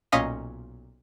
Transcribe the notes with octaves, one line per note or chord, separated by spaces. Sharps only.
B1 A#2 C#4 D#5 F5 B6